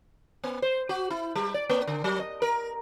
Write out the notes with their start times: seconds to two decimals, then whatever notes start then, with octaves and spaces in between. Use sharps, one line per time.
0.44 B3
0.62 C5
0.89 F#4
1.10 E4
1.35 G3
1.54 D5
1.70 A#3
1.87 D3
2.04 F#3
2.19 D#5
2.42 A#4